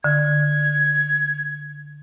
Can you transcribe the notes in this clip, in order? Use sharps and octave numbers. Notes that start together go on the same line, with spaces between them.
D3 G#6